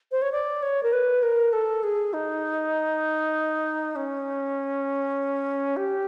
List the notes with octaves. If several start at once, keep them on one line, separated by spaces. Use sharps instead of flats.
C5
C#5
D5
C#5
A#4
B4
A#4
A4
G#4
D#4
C#4
G4